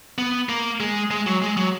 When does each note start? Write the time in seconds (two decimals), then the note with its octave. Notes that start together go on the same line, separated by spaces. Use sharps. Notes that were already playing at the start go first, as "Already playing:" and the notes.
0.18 B3
0.49 A#3
0.80 G#3
1.11 G#3
1.26 F#3
1.42 G#3
1.57 F#3